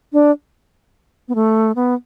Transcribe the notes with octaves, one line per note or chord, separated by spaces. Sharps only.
D4
B3
A3
B3